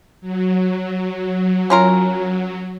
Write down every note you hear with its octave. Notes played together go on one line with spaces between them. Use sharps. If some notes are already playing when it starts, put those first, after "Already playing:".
F#3
C#4 F4 A#4